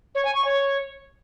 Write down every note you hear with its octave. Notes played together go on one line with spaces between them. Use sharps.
C#5
G#5
C#6
C#5